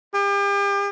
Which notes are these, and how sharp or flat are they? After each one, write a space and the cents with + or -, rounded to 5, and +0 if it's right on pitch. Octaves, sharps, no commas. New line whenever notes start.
G4 +40